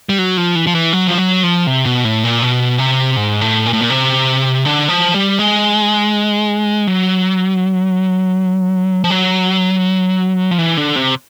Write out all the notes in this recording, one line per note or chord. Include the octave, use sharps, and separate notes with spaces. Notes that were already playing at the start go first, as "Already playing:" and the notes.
G3
F#3
F3
E3
F3
E3
F#3
F3
F#3
F3
C3
B2
A2
A#2
B2
C3
G#2
A2
A#2
A2
A#2
C3
D3
F3
G3
G#3
F#3
F3
F#3
F3
E3
D3
C3